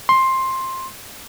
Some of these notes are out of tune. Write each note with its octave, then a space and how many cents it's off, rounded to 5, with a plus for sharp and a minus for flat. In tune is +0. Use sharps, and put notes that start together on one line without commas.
C6 +10